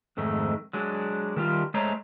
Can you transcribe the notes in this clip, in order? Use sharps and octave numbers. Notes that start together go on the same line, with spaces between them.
F2 G#2 D#3 A3
F#3 G#3 D4
D#3 G3 F4
G#3 A3 C5 C#5 A#5